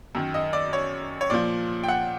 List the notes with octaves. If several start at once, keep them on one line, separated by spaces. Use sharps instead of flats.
F#2 D#3
D#5
D5
C#5
C#5
A#2 F3 D5
G5
F#5